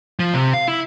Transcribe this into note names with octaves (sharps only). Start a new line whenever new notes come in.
F3
C3
F5
E4